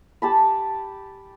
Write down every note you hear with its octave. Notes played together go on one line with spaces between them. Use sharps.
G4 A5 B5